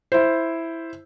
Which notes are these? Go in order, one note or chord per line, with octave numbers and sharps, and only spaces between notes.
E4 C5